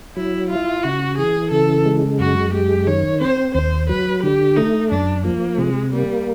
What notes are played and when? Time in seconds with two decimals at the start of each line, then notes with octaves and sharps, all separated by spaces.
0.16 F#3 E4
0.50 E4 F4
0.83 C#3 F#4
1.18 E3 G#4
1.51 C#3 A4
1.86 G#3
2.19 F#2 F#4
2.53 G#3 G4
2.87 D#3 C#5
3.21 C4 C5
3.55 D#2 C5
3.89 F#3 B4
4.23 D3 G4
4.56 A3 D#4
4.91 F#2 D4
5.25 F3 A#3
5.58 C3 G#3
5.93 G3 A#3